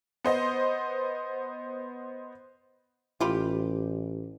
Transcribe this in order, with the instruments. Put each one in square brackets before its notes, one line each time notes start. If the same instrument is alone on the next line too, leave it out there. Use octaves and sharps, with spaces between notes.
[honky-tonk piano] B3 C5 D#5
[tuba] A1 [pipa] F4 G4 B5